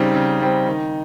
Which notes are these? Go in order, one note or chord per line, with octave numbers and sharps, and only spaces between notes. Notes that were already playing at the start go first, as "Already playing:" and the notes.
Already playing: C#3 G3 C4 D#4
C#3
G3 C4
D#3